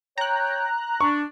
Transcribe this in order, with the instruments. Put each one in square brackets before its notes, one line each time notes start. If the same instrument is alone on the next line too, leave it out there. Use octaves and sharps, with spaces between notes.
[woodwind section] C#5 G5 [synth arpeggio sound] A#5 F#6
[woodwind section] D4 [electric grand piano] C#6